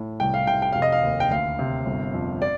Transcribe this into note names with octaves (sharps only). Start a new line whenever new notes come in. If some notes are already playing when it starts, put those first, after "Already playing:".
Already playing: A2
C2 G5
F5
C3 G5
G5
F1 F5
D#5
F5
D#2
G5
D2 F5
C3
G1
F2
D5